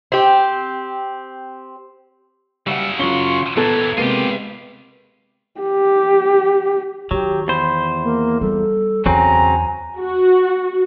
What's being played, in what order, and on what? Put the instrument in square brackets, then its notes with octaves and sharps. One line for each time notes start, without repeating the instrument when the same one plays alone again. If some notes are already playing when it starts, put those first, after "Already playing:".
[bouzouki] C4 G4
[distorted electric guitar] C#3 F#4 [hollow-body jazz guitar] G3 E5 F#5 [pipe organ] E6
[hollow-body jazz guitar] F#2 C#4 [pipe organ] F4 C6 C#6 [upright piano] G7
[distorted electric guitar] A#2 E3 [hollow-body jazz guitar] B3 [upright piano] A4 [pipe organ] G#6
[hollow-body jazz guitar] C3 A#3 [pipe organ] G#3 B3 [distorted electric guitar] F4 G4 [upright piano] D#7
[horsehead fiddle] G4
[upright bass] D#3 [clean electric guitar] F#3 [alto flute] G4
[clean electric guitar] E2 C5 [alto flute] B5
[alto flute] A#3
[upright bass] G3 [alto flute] A4
[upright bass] E2 [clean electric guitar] C#3 F#3 C4 [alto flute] G#5 [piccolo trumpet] A#5
[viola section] F#4